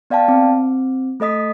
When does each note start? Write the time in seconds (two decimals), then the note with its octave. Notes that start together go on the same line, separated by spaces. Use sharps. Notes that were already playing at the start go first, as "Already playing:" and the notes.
0.10 B3 D5 F5 G5 A5
0.28 C4
1.20 A3 A4 D#5 D#6 B6